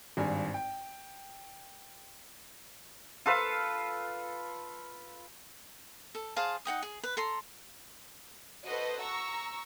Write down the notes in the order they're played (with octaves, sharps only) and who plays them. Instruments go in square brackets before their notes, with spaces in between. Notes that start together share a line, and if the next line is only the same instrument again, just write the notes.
[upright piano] G#1 G2 G#5
G5
[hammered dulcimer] F4 A4 B4 F5
[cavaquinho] A4
G#4 C5 F5 A5
D#4 F#5 G5 D#6
G#4
B4
A4 A#5 C6
[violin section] F#4 A4 B4 C5 D#5
A#5 C#6 E6